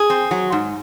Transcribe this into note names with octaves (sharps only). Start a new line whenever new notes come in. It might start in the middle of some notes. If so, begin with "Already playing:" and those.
Already playing: G#4
C4
F#3
G#2